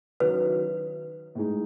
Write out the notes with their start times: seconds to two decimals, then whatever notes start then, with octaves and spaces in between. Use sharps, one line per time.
0.20 D#3 F#3 C#4 E4 B4
1.35 A2 G#3 D#4